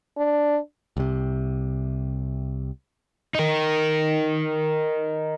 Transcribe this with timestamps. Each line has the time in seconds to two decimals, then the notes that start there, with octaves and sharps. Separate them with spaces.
0.18 D4
0.97 C2 C3
3.35 D#4 A#4